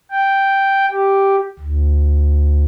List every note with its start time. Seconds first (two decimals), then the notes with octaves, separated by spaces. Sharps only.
0.11 G5
0.91 G4
1.59 D2